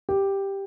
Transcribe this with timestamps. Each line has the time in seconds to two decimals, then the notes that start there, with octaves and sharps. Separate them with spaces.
0.09 G4